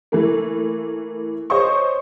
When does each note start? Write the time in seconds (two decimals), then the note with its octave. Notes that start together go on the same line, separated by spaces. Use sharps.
0.12 E3 A3 A#3
1.50 C5 C#5 D#5 C#6